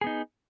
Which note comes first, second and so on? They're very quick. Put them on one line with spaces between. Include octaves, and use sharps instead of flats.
G#4 B3 D#4